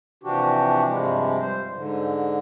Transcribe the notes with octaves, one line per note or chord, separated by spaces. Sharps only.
C3 E3 F3 D4 F#4 G4
G2 C3 F3 G3 G#3
C5
G#2 D3